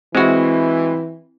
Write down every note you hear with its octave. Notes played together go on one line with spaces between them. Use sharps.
E3 G#3 C4 E4 F#4